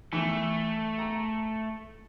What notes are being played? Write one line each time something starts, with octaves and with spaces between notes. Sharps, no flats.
E3 A3
A#5